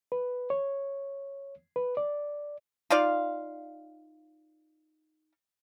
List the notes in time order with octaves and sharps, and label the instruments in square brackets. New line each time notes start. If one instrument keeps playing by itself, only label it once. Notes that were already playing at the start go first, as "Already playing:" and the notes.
[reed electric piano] B4
C#5
B4
D5
[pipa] D#4 F4 D5 F5